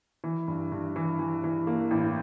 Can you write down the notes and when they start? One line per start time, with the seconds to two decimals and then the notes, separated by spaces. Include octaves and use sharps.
0.24 E3
0.48 G2
0.72 G2
0.96 E3
1.19 E3
1.44 E3
1.67 A#3
1.91 A1